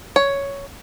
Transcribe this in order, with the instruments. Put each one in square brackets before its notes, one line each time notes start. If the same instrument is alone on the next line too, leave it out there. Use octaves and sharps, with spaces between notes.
[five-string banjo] C#5